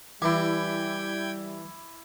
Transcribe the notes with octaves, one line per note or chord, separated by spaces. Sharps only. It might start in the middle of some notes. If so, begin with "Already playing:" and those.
E3 G3 E4 G5 D6 G#6